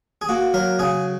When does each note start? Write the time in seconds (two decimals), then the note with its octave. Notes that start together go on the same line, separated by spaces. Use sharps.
0.21 G#4
0.29 A#3 F#4
0.54 F#3 A#4
0.79 C#3 G#4